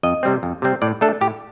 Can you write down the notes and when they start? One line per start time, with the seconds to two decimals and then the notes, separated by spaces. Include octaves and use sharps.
0.03 F2 D#5
0.23 C3 G3 C4
0.43 F2
0.62 C3 G3 C4
0.82 A2 D5
1.01 A3 D4 A4
1.21 A2 G4